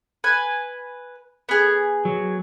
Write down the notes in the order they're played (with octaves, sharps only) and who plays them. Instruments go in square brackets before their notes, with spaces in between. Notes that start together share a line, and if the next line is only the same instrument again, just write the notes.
[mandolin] B4 G#5
B3 G#4
[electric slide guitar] F#3